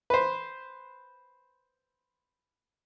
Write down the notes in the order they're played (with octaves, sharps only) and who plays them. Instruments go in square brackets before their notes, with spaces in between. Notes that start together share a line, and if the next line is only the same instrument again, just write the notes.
[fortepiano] B4 C5